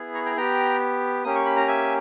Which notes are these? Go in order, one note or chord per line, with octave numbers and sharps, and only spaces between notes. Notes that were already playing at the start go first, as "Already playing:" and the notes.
Already playing: B3 E4 G#4
A#5 C#6
G5 A#5
B3 G4 G5 A#5
A#3 C#4 G4 D#6
C#6
B5
A#5
E5 G#5